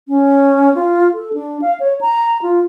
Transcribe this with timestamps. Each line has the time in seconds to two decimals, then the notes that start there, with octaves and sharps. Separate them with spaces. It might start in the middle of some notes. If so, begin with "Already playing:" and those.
0.08 C#4
0.75 F4
1.14 A4
1.33 D4
1.62 F5
1.80 C#5
2.01 A#5
2.42 F4